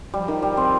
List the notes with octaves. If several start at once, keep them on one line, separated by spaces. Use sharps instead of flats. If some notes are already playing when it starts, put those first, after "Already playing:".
F3 G3
D#3
G3
C4